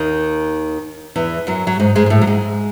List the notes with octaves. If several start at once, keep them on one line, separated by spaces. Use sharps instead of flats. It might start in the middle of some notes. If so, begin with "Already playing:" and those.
Already playing: D#2 D#3
E2 E3
F#2 F#3
F#3
G#2 G#3
G#2 G#3
G#3
A2 A3
F#3
G#2 G#3